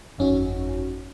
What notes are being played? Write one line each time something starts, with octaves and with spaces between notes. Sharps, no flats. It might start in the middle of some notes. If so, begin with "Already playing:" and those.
G1 F2 C#4 D#4 F#4